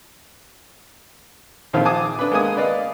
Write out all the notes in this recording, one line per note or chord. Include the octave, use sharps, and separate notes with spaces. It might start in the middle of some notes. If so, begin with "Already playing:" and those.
A#1 A#2 D#3 F3 C4 F5
G#5 A5 D6 D#6
D4 B4
G#3 A#3 B3 G#5 D#6
B4 D5 D#5 F5